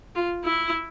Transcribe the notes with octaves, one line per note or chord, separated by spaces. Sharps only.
F4
E4